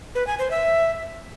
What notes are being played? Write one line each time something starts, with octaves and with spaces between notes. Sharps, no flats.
B4
G#5
C5
E5